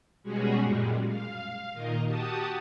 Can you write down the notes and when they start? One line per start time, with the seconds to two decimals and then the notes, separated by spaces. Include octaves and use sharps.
0.23 B2 G3 G#3 C#4 F#4 G#4
0.61 F#2 A#2 G3 G#3
1.06 F5
1.73 A#2 D#3 A#4 D#5
2.03 F#4 G4 A5 D#6